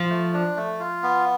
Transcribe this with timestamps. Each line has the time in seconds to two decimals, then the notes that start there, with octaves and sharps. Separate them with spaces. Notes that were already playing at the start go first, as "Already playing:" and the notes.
Already playing: F3
0.10 A3
0.33 D4
0.57 A3
0.80 F4
1.03 B3